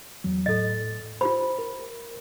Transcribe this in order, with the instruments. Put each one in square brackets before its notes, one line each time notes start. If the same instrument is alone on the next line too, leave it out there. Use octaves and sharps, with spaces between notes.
[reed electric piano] E2 F#3
[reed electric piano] A2 A6 [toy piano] A4 D#5
[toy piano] F4 G4 B5 [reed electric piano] C5
[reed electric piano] A#4